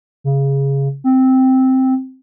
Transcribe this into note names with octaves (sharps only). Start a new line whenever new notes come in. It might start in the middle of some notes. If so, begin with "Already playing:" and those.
C#3
C4